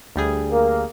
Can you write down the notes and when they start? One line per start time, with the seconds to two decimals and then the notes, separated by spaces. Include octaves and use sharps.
0.16 D2 G3 G#4
0.51 A#3